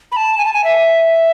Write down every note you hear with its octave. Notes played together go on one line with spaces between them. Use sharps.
B5
A5
G#5
A5
G#5
E5